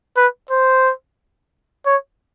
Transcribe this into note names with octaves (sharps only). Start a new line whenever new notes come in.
B4
C5
C#5